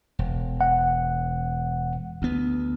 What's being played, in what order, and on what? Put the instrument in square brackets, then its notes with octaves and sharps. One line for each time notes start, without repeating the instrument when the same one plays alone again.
[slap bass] E1
[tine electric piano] F#5
[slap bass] D2 B3